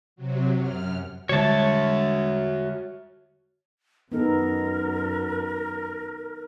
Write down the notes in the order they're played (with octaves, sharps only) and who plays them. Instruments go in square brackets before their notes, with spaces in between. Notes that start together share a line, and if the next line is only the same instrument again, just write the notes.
[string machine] C3 F#3
F#2 F6
[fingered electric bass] D3 G3 G#3 [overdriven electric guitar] F#4 E5 [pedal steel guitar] C#5 A5
[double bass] F#2 [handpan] B3 D#4 A4 [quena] A#4